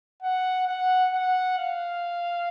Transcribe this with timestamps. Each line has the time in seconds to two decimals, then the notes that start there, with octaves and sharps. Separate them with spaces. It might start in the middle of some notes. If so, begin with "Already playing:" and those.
0.22 F#5
0.67 F#5
1.13 F#5
1.58 F5